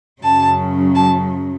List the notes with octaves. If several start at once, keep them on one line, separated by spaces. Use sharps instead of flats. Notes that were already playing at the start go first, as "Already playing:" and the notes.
F#2 C#3 F#3 A5
A5